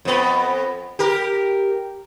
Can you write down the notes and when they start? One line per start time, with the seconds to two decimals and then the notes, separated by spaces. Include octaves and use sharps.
0.05 F2 B3
0.99 G4 A#4